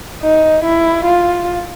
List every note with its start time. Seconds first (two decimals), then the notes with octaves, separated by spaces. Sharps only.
0.22 D#4
0.64 E4
1.05 F4